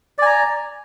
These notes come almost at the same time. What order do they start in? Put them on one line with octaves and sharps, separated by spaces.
D5 G#5 A#5